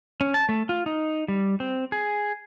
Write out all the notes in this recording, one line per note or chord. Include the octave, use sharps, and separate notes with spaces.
C#4
A5
A3
F4
D#4
G3
C4
G#4